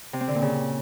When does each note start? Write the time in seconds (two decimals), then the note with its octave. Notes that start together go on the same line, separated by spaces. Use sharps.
0.13 C3
0.20 C4
0.27 D3
0.35 A#2
0.42 C#3